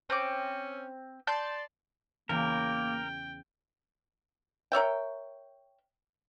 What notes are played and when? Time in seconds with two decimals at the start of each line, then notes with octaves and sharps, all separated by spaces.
0.10 C4 C#4 D6
1.27 D5 A5 C6 G6
2.29 E2 C#3 A#3 A#4 G5 B5
4.72 A#4 C#5 E5 G5